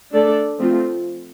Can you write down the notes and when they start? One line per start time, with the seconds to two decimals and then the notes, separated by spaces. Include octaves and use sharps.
0.13 A3 D4 A4 D5
0.58 F3 A3 C4 F4